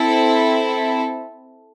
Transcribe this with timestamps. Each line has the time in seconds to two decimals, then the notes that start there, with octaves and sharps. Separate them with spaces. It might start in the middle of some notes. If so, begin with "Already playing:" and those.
Already playing: C4 E4 A4